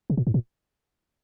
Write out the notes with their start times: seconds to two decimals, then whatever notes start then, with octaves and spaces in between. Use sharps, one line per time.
0.10 C3
0.17 A#2
0.27 G#2
0.34 A#2